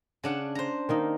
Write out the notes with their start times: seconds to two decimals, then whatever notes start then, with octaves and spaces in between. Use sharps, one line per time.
0.23 C#3 D4 F#5
0.55 C5 A#5
0.89 D#3 A#3 D#4